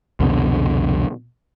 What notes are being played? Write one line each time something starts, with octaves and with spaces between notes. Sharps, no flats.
C2 F2 B2 D3